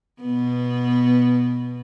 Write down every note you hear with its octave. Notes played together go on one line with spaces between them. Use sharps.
B2 B3